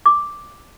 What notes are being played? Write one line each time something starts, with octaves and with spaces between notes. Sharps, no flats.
D6